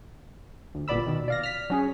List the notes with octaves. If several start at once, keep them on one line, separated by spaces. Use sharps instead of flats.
D2
G1 A#2 B3 D5 B5 E6
B2 D#3
D5 F5 A#6
F6 B6
F#3 C#4 G#4